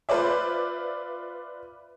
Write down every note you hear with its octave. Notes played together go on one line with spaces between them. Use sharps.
F4 B4 C5 D5 E5